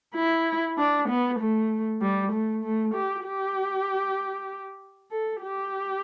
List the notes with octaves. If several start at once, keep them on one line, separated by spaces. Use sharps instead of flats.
E4
D4
B3
A3
G3
A3
A3
G4
G4
A4
G4